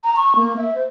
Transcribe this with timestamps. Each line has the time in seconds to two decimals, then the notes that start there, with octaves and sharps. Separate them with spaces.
0.04 A#5
0.16 C#6
0.36 A#3
0.57 E5
0.75 C5